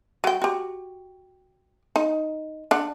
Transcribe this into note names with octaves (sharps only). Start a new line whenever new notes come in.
F#3 G5
F#4 G4
D#4
D4 F#5